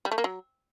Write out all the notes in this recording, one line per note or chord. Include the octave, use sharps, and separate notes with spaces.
G3
A3
A#3
F#3